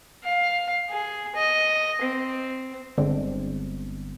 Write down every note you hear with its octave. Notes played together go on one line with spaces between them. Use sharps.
F5
G#4
D#5
C4
G1 D3 G#3 C4